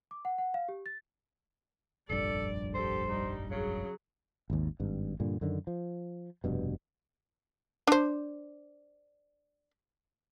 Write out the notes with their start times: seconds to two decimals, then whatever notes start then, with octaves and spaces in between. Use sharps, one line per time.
0.11 D6
0.25 F#5
0.38 F#5
0.54 F5
0.69 G4
0.86 A6
2.09 F1 A#1 G2 A4 D5
2.74 G4 A4 C5
3.09 G3 D#4
3.51 C#3 F#3 G#4
4.50 G#1 D#2
4.80 G#1 G2
5.20 G2 A#2 D3
5.41 F#2 D3 D#3
5.67 F3
6.44 F1 G2 B2
7.87 D4 C5